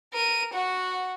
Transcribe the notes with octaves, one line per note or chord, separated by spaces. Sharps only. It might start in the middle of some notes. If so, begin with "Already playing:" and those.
A#4 D#7
F#4 F#5